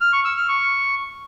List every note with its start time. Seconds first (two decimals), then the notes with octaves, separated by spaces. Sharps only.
0.01 F6
0.13 C#6
0.25 E6
0.37 F6
0.49 C#6